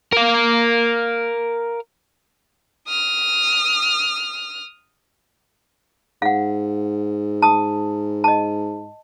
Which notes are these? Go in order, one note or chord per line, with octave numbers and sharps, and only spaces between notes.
A#4 F5
D#6 F6
G#2 F5 F#5
A5 D#6
D#5 A5